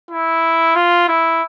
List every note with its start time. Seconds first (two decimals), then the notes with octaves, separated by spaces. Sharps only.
0.11 E4
0.75 F4
1.08 E4